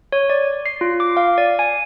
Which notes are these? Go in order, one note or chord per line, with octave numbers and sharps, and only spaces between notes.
C#5
D5
C7
F4
D6
F5
D5
G#5